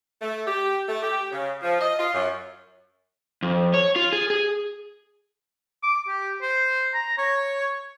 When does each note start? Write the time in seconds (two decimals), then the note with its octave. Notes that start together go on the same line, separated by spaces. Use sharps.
0.21 A3
0.46 G4
0.89 A3
1.02 G4
1.32 C#3
1.62 F3
1.81 D#5
1.98 F4
2.14 F#2
3.42 F2
3.74 C#5
3.96 F4
4.13 G#4
4.30 G#4
5.83 D6
6.08 G4
6.42 C5
6.94 A#5
7.18 C#5